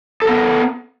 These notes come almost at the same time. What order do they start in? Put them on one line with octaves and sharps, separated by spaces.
A4 A#4 B3